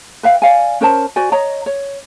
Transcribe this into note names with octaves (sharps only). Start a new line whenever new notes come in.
B4 E5 F5 G5
D5 F5 G#5
C#4 A#4 C5 A5
F#4 C5 D5 G#5
C#5 D#5 A#5
C#5